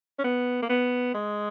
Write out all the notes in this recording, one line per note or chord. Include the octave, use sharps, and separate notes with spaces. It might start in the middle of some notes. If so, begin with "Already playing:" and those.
C#4
B3
A#3
B3
G#3